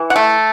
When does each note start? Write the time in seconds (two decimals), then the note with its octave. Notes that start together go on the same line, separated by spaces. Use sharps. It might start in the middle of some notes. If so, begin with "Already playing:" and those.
Already playing: E3
0.10 F#5
0.16 A3